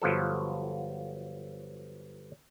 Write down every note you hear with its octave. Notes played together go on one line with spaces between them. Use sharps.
G1 F3 F#3 A4